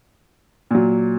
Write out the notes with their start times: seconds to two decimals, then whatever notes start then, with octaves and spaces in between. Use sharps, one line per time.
0.71 A#2 F#3